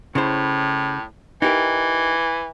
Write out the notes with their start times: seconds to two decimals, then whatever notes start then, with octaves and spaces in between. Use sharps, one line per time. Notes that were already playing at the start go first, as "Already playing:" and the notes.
0.15 A2 C#3 E4 C5
1.42 E3 D#4 G4 A#4